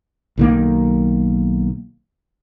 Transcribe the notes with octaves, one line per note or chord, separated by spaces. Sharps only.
B1 D#3 A#3